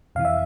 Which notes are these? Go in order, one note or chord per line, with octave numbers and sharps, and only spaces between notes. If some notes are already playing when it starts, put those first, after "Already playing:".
F2 C3 E3 F5
E5